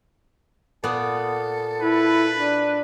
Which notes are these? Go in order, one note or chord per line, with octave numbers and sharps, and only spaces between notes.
A#2 B3 A4
E4 B4
D4